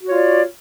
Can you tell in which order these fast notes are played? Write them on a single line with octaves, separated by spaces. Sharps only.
F#4 C#5 F4 D5